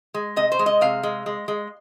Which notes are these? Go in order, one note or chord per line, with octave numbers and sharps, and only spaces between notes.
G#3
C3 D#5
C5
G#3
D#5
C3 F5
G#3
G#3
G#3